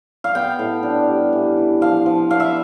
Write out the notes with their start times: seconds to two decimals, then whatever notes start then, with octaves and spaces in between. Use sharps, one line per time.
0.24 F5
0.35 B3 G5
0.59 A2
0.83 D4
1.08 G3
1.33 E3
1.57 E3
1.81 F3 F5
2.06 F3
2.30 B3 F5
2.40 E5